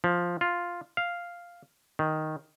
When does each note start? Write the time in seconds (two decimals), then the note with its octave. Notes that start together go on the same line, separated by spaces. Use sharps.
0.04 F3
0.41 F4
0.97 F5
1.99 D#3